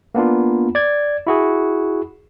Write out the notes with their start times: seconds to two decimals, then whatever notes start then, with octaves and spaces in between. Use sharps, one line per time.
0.15 A#3 B3 D4 F4
0.75 D5 G#6
1.27 E4 F#4 G#4